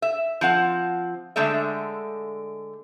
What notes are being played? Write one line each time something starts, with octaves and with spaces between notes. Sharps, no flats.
E5
F3 C4 F#5
D3 G#3 A3 D5 E5